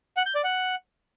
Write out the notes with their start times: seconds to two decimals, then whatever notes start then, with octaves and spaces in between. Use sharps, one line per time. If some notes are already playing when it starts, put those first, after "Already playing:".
0.17 F#5
0.26 G6
0.35 D5
0.44 F#5